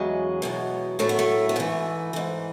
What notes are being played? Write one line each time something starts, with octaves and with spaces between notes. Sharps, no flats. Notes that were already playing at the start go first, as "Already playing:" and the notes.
Already playing: E2 C#3 F#3 G#3
E2 B2 F#3
A2 F#3 A3
B3
A3
B3
G#2 E3 A3
G#2 E3